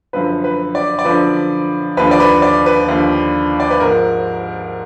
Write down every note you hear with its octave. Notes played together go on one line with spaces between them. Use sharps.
F#2 D3 F3 B4
B4
D5
D5
F#2 D3 F3 B4
D#2 D3 F3 B4
D5
B4
D5
B4
D#2 D3 F3
D5
B4
G#2 F3 A#4